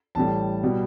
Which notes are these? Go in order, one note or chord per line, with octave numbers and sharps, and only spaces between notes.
A1 A2 G3 A5
B2 G3